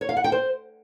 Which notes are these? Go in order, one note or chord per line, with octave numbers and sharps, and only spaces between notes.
C#5
F5
F#5
G5
C5